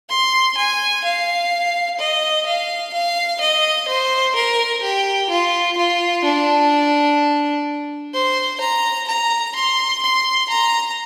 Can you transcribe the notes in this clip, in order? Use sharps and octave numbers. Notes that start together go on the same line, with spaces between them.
C6
G#5
F5
D#5
F5
F5
D#5
C5
A#4
G4
F4
F4
D4
C5
A#5
A#5
C6
C6
A#5